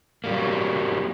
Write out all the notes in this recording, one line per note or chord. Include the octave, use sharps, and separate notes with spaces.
F#3 G3 A#3